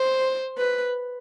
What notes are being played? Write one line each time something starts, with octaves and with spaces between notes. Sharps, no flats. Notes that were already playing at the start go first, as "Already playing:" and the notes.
Already playing: C5
B4